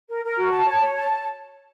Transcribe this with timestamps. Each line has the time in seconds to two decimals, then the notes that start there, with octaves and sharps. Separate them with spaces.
0.08 A#4
0.23 A#4
0.37 F#4
0.51 A5
0.65 C#5
0.81 C#5
0.95 A5